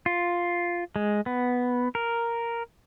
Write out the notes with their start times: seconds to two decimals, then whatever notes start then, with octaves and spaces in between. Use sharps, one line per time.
0.06 F4
0.96 G#3
1.26 B3
1.95 A#4